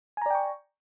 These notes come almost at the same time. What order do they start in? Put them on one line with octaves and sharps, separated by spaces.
G#5 A#5 D5 G5 C#6